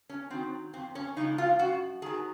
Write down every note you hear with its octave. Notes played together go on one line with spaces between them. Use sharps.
C#4
D#3 F#3 C4
F2 C4
C#4
C#3 F3 G#3 D#4
F4
F#2 F#4
D#3 F#3 G#4